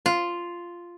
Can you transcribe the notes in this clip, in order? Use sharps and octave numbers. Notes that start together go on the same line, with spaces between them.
F4